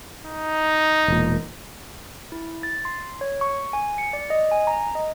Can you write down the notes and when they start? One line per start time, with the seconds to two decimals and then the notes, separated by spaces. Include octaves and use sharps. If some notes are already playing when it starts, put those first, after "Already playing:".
0.24 D#4
1.08 E1 A#2
2.32 E4
2.63 A6
2.85 C6
3.21 C#5
3.41 C#6
3.73 G#5
3.98 C#7
4.13 D5
4.30 D#5
4.51 G#5
4.67 A#5
4.95 D#5